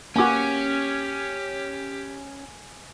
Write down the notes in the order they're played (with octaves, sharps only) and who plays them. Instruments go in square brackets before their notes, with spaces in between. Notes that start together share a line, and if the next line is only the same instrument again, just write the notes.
[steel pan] A#3 F#4 [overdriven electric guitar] C#4 [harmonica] G4 [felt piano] G#5 D6